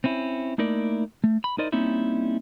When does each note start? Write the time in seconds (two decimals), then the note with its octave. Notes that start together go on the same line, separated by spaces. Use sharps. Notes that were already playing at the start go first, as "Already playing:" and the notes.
0.04 C4 C#4 E4
0.58 A3 A#3 D#4 E4 A#4 D5
1.24 A3
1.44 B5
1.58 D#4 E4 A#4 C5 D5 D#5
1.72 G3 A#3 C4 C#4 D#4 E4